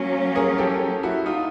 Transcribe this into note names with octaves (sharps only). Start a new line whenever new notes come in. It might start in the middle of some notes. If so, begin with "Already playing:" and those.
Already playing: F#3 A#3 C#4
G#4 A#4
G4 A4
E4 F#4
D#4 F4